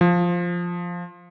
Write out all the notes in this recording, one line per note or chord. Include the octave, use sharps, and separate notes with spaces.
F3